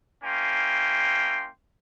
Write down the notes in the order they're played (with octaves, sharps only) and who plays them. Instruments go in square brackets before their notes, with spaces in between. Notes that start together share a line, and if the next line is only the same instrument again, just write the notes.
[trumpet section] A#3 C#4 E4 G5 C6